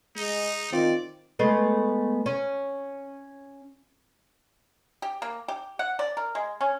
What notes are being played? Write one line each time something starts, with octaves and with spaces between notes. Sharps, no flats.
G#3 D#4
D#3 C4 F4 D5
G#3 A3 B3
C#4
G4
A#3
G4
F#5
D5
A#4
G#3
C#4